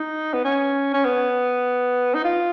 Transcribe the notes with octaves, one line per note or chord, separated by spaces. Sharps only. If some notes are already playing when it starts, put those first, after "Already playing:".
Already playing: D#4
B3
C#4
C#4
B3
D#4
F4